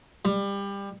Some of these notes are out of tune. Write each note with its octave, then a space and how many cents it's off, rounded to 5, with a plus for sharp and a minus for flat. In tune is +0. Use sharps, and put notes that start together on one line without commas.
G3 +25